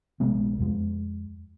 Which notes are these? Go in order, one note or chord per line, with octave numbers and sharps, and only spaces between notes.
A#1 C3 G#3 B3
F2 G#3